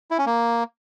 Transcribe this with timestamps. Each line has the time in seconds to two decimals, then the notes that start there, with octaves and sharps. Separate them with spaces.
0.11 E4
0.18 C#4
0.26 A#3